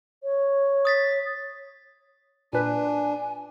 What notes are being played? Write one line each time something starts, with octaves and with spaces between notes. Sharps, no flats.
C#5
D#6 A6 B6
A#2 D4 B4 G#5